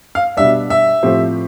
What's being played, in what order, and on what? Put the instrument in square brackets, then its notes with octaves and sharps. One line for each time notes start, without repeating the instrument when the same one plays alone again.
[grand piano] F5
[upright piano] B2 G3 D4 [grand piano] E5
[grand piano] E5
[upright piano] A2 F3 C4 G4 C5